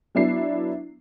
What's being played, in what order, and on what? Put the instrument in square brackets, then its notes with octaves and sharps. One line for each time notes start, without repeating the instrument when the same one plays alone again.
[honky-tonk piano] F#3 B3 D4 E4 C7